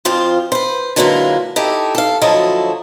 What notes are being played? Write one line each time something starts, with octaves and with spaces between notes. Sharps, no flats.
F2 F3 F4 C5
B4 C5
D3 F#3 G#3 A#3 E4 F4
D#4 E4 G4 A4
A4 F5
D2 F3 F#3 E4 A4 D#5